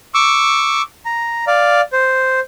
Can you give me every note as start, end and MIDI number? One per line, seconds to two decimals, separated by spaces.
0.14 0.82 85
0.14 0.82 86
0.14 0.82 88
1.05 1.45 82
1.47 1.81 74
1.47 1.81 77
1.93 2.40 72